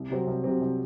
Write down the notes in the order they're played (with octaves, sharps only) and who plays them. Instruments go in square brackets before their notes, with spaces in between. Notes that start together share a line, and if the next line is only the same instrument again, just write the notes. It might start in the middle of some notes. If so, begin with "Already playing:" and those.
Already playing: [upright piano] C2
C3 F#3 C4
C2
C3 F#3 C4
C2